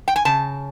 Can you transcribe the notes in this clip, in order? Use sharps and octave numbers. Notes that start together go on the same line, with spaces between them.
G5
G#5
C#3 A5